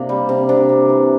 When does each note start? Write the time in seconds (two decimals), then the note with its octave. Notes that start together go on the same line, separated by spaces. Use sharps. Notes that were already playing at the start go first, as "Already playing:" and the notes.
Already playing: C3 A#3 D4
0.09 G3
0.29 C3
0.49 C3 D4
0.69 C3
0.89 E3